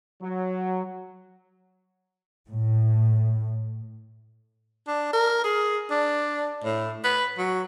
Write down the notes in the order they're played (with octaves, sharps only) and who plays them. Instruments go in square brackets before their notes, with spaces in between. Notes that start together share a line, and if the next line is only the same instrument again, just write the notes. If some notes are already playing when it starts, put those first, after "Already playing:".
[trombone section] F#3
[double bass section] A2
[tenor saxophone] D4
A#4
G#4
D4
A2
B4
F#3